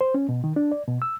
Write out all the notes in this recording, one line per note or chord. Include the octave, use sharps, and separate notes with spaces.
C5
C#4
B2
D#3
D4
D5
B2
E6